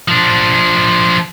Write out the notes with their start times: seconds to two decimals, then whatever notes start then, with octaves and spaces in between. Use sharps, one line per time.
0.08 F3 D4